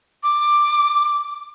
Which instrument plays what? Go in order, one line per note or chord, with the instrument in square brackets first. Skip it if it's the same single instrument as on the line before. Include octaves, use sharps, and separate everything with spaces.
[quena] D6